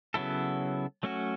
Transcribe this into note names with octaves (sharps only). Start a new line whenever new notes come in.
C#3 F#3 B3 E4 A4
F#3 A3 C#4 F#4